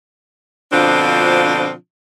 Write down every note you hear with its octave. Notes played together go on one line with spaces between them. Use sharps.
B2 D3 F3 C4 D4 F4